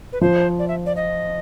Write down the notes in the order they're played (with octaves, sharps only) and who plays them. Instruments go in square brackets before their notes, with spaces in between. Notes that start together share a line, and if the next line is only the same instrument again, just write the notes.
[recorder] B4
[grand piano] F3 [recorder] C5
[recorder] D5
E5
D5
D#5